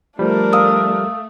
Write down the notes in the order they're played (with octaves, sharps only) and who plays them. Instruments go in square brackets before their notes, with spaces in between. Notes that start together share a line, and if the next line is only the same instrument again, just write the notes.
[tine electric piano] F3 G3 [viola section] A3 [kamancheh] D4 A#4
[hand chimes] F5 D#6 E6